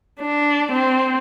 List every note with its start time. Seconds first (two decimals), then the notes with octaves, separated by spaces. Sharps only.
0.20 D4
0.72 C4